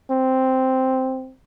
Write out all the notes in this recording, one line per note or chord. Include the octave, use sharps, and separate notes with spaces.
C4